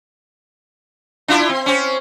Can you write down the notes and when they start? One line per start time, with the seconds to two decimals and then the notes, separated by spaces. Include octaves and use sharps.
1.28 D4 E4 F4
1.49 C4
1.66 C4 C#4